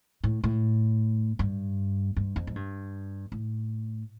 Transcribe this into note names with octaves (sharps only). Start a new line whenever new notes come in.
A2
A2
G2
G2
F2
A2
G2
A2